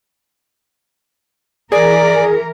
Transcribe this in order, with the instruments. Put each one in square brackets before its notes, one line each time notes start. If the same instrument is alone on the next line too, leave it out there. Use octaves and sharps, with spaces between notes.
[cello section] E3 A#4 [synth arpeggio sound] G#4 [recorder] D5